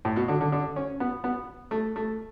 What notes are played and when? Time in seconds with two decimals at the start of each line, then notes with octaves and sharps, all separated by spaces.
0.05 A2
0.16 B2
0.28 D3
0.41 D3
0.52 D3
0.76 C#4
1.00 B3
1.24 B3
1.71 A3
1.96 A3